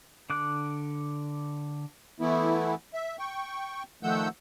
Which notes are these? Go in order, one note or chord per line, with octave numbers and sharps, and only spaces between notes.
D3 D6 F#6
E3 A3 B3 E4
E5
G5 C#6
D#3 F3 A3 F#5 E6 G6